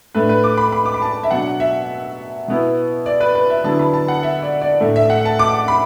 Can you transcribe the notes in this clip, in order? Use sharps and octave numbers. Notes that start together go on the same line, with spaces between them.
A2 A3 D4 B4
B4
D6
B5
B5
D6
B5
A5
E5
B2 F#3 D4 F#5
E5
B2 B3 E4
D5
B4
B4
E5
D3 F#3 B3 E4 A5
B5
A5
F#5
E5
D5
D5
A2 A3 D4
E5
F#5
A5
D6
B5